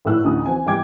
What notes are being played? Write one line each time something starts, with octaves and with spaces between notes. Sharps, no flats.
G#1 A2 B4 E6 F#6
A1 D2 D#4 D#6
E3 C4 G#5
G#2 E3 G3 G5 D6 G#6